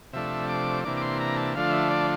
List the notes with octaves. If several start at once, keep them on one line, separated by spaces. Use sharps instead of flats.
C3 F3 A3 D4 E5
D6
C3 E3 A#3 D4 D6
D6
C6
A#5
A5
D3 F3 A3 D4 F4 F5
E5
D5